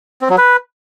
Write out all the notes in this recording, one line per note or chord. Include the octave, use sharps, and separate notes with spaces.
C4
F#3
B4